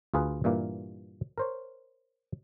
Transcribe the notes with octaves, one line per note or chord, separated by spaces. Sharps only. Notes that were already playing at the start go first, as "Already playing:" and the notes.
D2 F4 G#4 B4
G2 A#2 E3 A#3
A#4 C5 C#5